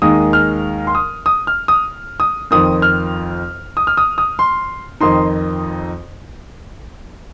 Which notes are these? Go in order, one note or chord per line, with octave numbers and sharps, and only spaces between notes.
D#2 D#3 G#3 D#4 D#6
F6
C6
D#6
D#6
F6
D#6
D#6
F2 D#3 C4 D#6
F6
D#6
F6
D#6
D#6
C6
F2 D#3 C4 D#4 C6